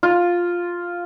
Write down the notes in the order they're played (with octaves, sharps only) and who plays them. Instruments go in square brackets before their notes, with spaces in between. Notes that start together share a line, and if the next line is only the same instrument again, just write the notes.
[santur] F4